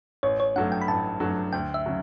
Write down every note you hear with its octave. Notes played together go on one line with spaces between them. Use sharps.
A1 C#5
C#5
G2 F#3 A3 F#5
G5
B5
A1 A5
G2 F#3 A3
D2 G5
E5
C#3 F#3